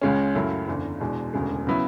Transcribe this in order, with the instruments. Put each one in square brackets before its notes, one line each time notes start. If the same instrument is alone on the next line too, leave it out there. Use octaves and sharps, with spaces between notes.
[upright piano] C#2 C#3 G#3 C#4
F#2 C#3 F#3 A3 E4
F#1 E2 D3
E2 B2 G#3 D4
E1 D2 C#3 G#3
C#3 F#3 B3 E4